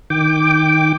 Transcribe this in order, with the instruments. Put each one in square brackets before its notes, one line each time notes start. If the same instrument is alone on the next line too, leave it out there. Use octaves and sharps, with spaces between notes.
[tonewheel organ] D#3 G5 D6